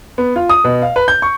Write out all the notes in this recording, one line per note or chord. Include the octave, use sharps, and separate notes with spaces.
B3
F4
D#6
B2
F5
B4
G6
C#6